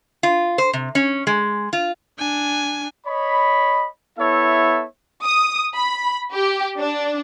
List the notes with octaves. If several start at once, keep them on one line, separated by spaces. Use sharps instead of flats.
F4
C5
C3
C#4
G#3
F4
D4 G#5
C#5 D#5 B5
B3 E4 A4 C#5 E5
D#6
B5
G4
D4